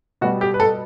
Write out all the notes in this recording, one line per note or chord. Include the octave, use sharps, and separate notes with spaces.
B2 G3 F#4
G4
B4
A4